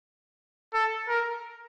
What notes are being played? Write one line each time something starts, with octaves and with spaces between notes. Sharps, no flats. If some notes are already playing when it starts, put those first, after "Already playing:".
A4
A#4